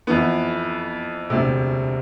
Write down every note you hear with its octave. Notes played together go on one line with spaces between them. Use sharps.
F2 E3 B3
E1 D2 C3